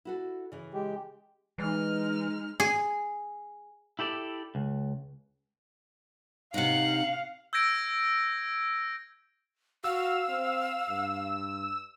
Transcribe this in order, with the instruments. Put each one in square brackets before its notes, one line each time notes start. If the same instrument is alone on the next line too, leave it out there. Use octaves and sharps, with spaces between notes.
[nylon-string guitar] E4 F#4 A4
C#3 E3
[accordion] G#3 G4
[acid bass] E3 [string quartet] G#3 D#4 F6
[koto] G#4
[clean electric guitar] E4 G4 A4 D5
C#2
[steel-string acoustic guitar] C3 D#4 [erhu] F5 [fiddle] F#5
[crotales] E6 G6 G#6 A#6 D7
[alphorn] F#4 [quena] F5 [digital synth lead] E6
[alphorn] C4
G2